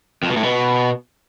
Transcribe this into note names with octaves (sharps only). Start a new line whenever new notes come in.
F2
B2
A2
B2